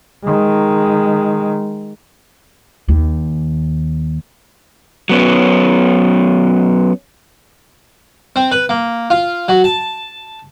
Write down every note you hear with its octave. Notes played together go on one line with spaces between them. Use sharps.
D#3 G#3
D#2
F#3 B3 C#4
C4
B4
A#3
F4
F#3
A5